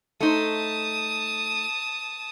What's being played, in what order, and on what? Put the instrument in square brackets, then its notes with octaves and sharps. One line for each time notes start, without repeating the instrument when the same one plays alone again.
[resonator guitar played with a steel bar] A3 D#4 C5 [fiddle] A5 D#6